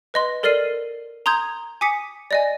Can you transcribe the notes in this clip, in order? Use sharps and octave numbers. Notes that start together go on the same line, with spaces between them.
B4 D#5 C6
A4 A#4 D5 F6 C7 D#7
A#5 C6 D#6 G6 G#6
G#5 D6 D#6 B6 C#7
D5 D#5 G#5